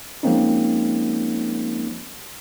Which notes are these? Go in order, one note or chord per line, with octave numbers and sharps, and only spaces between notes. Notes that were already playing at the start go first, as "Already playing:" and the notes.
F3 G#3 A#3 C4 C#4 D#4